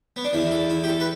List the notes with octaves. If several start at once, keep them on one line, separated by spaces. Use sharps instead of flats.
B3
D4
E2 E3 E4
A4
E4
G4
A4
B4